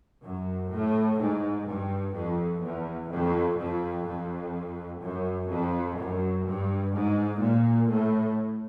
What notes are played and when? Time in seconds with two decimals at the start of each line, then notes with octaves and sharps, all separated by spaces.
0.24 F#2
0.72 A2
1.19 G#2
1.68 G2
2.15 F2
2.62 E2
3.10 F2
3.58 F2
4.06 F2
5.02 F#2
5.49 F2
5.97 F#2
6.45 G2
6.93 G#2
7.40 A#2
7.88 A2